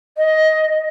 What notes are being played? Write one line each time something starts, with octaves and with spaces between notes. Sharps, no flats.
D#5